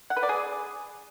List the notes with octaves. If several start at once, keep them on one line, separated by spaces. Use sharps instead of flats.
F#5
B4
D5
G#4